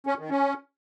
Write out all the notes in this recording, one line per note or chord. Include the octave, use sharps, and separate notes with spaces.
C#4
D#3
C#4